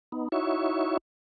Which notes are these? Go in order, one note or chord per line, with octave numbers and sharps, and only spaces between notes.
B3 D#4
D#4 E4 F#4 C#5 E5 C#6